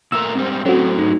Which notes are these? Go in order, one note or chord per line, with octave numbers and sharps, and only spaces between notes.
A#2 A3 A#4 E6
G#2 G3 C4
A2 F#3 C#4 F#4 A4
G#2 D#4